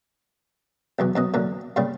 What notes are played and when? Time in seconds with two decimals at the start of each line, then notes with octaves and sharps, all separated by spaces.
0.99 B1 E2 B2
1.16 F#2 B2 D#5
1.34 F#2 A#2 D3
1.76 G2 A#2 C#3 G3